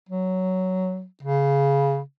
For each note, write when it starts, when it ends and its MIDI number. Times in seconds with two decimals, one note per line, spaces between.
0.09 1.05 54
1.23 2.00 49